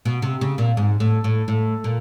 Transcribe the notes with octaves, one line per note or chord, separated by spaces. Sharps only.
B2
C3
C#3
A#2
G#2
A2
A2
A2
A#2